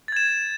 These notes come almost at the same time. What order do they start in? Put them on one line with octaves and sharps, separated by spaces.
A6 G#6 E7